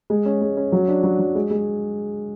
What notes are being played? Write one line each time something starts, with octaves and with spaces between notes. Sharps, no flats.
G#3
C#4
G#3
C#4
F#3
D4
F#3
F#3
G#3
G#3